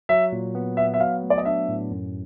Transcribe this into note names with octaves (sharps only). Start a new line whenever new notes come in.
F#3 E5
A#2
B3
B3 E5
E5
F#3 F5
A3
D5
D#5
D4 E5
A2
F#2